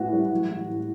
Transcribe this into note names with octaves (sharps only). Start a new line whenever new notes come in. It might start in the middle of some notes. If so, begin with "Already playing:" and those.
Already playing: A2 E3 F#4
G3
F#3
A2
A2